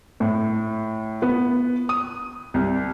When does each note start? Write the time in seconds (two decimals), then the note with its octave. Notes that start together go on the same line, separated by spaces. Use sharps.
0.20 A2
1.22 B3
1.89 D#6
2.54 C2